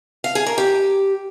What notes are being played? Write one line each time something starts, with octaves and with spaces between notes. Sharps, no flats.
F5
G#4
A#4
G4